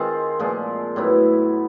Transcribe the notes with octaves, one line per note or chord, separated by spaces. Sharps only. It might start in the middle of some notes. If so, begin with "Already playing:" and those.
Already playing: D#3 G#3 C4 F4
A#2 F3 G#3
A2 F#3 B3 E4